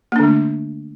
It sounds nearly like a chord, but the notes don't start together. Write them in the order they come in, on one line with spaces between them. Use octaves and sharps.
A#3 D4 D3 A3